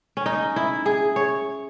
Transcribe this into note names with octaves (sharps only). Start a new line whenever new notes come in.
C#4
D#4
E4
G#4
C#5